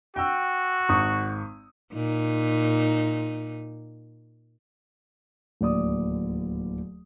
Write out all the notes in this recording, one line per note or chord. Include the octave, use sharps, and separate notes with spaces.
F#4 G5 E6
G#1 C#6 D#6
A#2 D#4
D1 D#2 D5 D#6